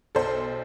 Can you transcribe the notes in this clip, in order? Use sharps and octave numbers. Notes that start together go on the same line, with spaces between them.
B1 A4 C5